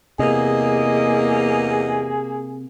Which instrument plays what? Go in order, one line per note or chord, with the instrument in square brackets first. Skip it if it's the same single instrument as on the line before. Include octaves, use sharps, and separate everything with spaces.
[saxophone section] E2 D#5 [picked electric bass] C3 [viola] A#3 [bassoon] G#4